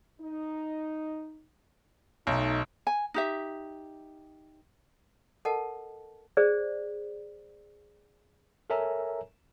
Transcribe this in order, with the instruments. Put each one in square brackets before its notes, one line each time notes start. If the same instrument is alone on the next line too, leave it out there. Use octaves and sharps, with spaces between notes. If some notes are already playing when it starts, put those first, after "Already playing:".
[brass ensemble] D#4
[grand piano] B1 [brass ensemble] A3 D#4
[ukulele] G#5
D#4 G4 E5
[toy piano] A4 A#4 D#5 F#5 A5
G#4 C5 D5
[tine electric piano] A4 A#4 C#5 E5 G#5 A#5